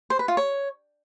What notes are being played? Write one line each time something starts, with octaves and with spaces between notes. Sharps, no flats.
C5
B4
F4
C#5